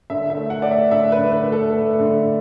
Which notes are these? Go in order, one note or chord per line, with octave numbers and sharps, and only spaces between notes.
D3 E5
E5
A3
F#5
A3 D5
E5
D3 E5
B4
D3
B4
A3
A4
A3
D3